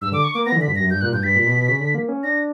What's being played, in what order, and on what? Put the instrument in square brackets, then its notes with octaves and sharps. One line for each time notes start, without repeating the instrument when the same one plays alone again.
[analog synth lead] G2 [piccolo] E6
[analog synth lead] D3 [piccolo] D6
[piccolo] C#6
[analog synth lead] A#3 [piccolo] D6
[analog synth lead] B3 [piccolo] A#6
[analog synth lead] E3
[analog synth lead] D3 [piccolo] B6
[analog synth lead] G2
[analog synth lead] F#2 [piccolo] A#6
[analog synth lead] G2 [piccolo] G6
[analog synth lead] A#2 [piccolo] F#6
[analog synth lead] G2 [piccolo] G6
[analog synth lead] G2 [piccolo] B6
[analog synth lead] A#2
B2
B2
C#3
D3
A#3
C#4
[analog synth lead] D4 [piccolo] A#6